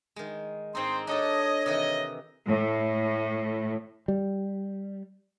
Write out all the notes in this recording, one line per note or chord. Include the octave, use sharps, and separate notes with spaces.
D#3 G#3
G#2 C4 D#4 C6
D4 G4 A4 C#5 D#5
C3 D#3 E3 D#5
A2
G3